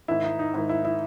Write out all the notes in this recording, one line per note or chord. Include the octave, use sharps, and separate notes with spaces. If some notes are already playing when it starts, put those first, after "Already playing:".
G#2 D#3 E4
D#4
D#4
G#2 D#3 E4
E4
E4